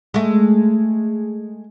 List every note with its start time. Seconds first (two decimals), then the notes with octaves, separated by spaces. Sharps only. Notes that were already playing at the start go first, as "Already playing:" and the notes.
0.14 G#3 A3